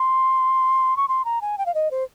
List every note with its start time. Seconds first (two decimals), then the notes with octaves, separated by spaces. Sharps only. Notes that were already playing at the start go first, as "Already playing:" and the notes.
Already playing: C6
0.97 C#6
1.08 C6
1.25 A#5
1.42 G#5
1.58 G5
1.66 F5
1.75 D#5
1.91 C5